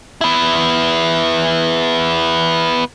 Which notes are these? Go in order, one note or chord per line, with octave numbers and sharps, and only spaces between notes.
B3 E4